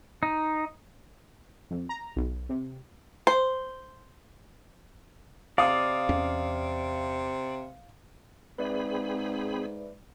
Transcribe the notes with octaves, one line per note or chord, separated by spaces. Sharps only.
D#4
F2
A#5
B1
C3
C5
C3 D5 F5 D#6
E2 C#4
G#2 C4 G#4 B4 D5 E5 B5